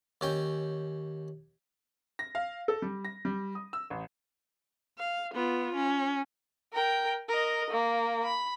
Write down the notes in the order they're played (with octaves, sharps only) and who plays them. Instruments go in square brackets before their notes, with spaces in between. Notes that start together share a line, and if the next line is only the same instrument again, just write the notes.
[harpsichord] D#2 C#4 G5
[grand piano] A#6
F5
A4
G3
A#6
G3
D#6
E6
A1
[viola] F5
B3 F4
C#4
[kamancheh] A#4 G5
A#4 D#5
A#3
B5